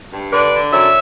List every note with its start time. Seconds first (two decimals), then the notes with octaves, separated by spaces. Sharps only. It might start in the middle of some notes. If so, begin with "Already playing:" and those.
0.13 G2
0.32 D3 B4 D5
0.53 D3
0.72 F#2 C#5 E5